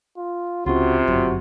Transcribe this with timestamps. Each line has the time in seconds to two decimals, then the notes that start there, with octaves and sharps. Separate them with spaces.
0.17 F4
0.66 C#2 C3 C#4 F4 F#4
1.08 G1 F#2 F#3 F#4